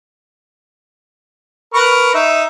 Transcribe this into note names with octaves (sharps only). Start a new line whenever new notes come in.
A#4 B4 C#6
D#4 E5